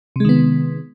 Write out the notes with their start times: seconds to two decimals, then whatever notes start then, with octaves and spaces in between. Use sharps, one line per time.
0.16 C3
0.20 G#3
0.25 D#3
0.29 B3